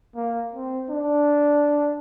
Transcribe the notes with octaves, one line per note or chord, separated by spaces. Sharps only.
A#3
C4
D4